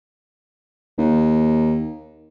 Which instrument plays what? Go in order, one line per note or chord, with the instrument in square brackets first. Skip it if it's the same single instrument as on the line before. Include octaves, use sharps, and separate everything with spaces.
[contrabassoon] D#2